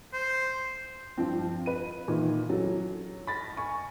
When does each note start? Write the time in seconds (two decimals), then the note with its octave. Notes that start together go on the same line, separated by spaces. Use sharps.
0.13 C5
1.18 G2 F3 C4
1.66 B4 D#7
2.08 A#2 D#3 E3
2.49 F#3 C#4 A4
3.27 B5 A6 A#6
3.57 G#5 C#6